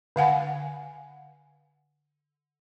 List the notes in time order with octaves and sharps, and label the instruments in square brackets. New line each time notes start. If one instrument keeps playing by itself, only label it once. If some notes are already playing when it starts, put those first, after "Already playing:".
[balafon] D3 F5 F#5 G#5